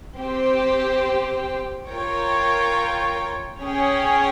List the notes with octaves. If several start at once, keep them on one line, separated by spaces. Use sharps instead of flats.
C4 G4 C5 G5
F4 A#4 C#5 G5
C#4 G#4 C#5 G5